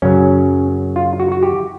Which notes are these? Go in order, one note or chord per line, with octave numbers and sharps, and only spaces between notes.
F#2 C#3 F#3 C#4
F4
F#4
F#4
G4